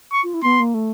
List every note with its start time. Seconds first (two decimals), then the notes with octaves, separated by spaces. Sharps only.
0.13 C#6
0.23 F4
0.34 E4
0.43 B3 C6
0.60 A#3
0.74 A3